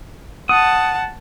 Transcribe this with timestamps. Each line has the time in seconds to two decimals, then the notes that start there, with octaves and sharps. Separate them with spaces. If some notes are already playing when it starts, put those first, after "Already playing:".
0.49 F#5 A5 D#6